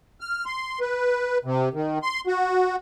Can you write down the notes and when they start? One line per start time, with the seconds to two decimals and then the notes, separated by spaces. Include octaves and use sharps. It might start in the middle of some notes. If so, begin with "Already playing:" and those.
0.21 F6
0.46 C6
0.81 B4
1.45 C3
1.74 D#3
2.03 C6
2.27 F#4